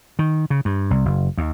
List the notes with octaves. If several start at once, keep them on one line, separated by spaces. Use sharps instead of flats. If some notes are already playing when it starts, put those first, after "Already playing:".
D#3
C#3
G2
C2
F#1
D#2